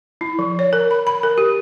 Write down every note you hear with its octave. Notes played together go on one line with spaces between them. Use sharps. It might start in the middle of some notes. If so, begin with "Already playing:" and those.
E4
F3
C#5
A#4
B5
B5
A#4
G4